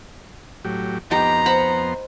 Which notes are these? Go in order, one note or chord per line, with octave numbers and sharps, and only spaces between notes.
A2 F#3 G4
F2 B3 D#4 G4 A#5 C6
C5 F#5 B5